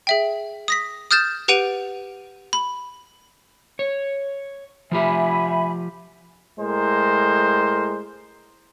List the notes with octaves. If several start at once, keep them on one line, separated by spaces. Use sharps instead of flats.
G#4 E5 G5
D#6 A#6 B6
D#6 F6 G6 A6 E7
G4 B4 F#5 D7 D#7 F7
B5
C#5
F3 F4 G4 E5 G#5 B5
A2 G#3 A#4 C5